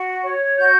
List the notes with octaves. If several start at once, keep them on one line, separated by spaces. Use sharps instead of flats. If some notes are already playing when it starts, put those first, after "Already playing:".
Already playing: F#4
C#5
F#4 G6